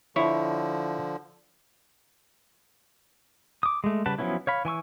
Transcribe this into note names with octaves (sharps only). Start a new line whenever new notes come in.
D3 F3 E4 C#5
D6 D#6
G#3 A3
C#3 G3 B4 F#5 A5
F3 F#3 B3 C#4 E4
C#5 F5 B5
E3 G#5 C#6 E6